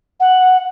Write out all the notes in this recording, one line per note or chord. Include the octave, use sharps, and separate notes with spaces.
F#5